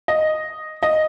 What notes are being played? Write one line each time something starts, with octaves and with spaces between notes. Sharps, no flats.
D#5
D#5